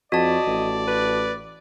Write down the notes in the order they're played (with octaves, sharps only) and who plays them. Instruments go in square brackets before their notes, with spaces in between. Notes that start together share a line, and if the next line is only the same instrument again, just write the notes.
[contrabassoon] F2 [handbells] F#4 A5 [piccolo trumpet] D5 [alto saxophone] D#5
[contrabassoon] A1
[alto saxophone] B4